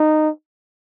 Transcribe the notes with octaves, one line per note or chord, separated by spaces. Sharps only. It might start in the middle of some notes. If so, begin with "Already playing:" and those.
Already playing: D#4